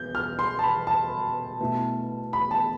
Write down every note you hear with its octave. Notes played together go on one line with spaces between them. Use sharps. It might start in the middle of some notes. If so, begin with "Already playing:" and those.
Already playing: B2 G6
F6
C6
A5
B5
A5
B2 A3 E4
B5
A5